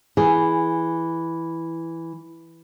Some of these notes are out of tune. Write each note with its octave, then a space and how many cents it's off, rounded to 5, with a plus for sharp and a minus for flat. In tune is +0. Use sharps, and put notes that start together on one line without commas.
E3 +0 G#4 +0